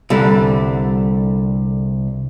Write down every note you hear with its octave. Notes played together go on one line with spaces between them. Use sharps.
C2 D3 G3 A3 D4